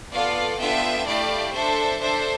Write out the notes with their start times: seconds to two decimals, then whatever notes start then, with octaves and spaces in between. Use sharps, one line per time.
0.11 B3 F4 A4 D5 F5
0.59 B3 D4 F4 A4 E5 G5
1.06 A3 E4 G4 D5 F5
1.54 D4 A4 C5 E5
2.01 D4 A4 C5 E5